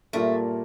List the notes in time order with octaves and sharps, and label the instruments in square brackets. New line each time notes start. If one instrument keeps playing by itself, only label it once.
[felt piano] A#2 G3 A#3 F4 A#4 [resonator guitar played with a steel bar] A3